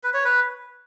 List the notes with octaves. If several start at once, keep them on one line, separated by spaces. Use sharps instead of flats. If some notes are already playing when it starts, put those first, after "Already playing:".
B4
C#5
B4